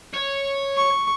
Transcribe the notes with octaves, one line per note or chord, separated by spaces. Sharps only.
C#5
C#6